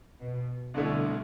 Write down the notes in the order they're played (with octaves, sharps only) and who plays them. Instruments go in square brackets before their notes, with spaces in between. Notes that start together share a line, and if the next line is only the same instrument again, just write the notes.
[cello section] B2
[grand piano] C2 B2 A3 E4 [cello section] D3